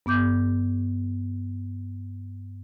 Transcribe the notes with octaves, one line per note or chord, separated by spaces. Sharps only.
G2 B3 D6 G6